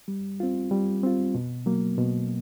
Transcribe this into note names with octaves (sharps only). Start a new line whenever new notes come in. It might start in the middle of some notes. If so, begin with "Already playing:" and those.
G3
C4 F4
G3
C4 F4
B2
F#3 A#3
B2